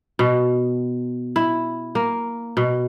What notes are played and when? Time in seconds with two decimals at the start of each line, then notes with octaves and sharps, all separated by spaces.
0.19 B2
1.36 E4
1.95 A#3
2.57 B2